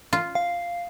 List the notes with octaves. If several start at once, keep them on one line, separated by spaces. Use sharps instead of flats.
F4
F5